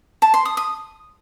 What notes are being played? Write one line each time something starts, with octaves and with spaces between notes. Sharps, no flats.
A5
C6
D#6
D#6